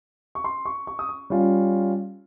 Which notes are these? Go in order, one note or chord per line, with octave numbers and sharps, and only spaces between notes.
C#6
C6
C#6
C#6
D#6
C#6
G3 C#4 F4